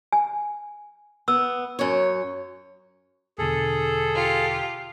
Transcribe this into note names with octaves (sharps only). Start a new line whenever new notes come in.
G#5
B3 E6
F#2 C#5
E2 B2 D3 G#4 A4
F4 G4